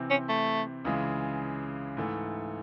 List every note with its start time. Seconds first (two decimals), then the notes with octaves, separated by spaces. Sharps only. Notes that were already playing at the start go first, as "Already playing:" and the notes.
Already playing: C3 E3 C4
0.10 C#4
0.29 A3
0.85 C#2 C#3 E3 G#3
1.97 G#2 E3 A3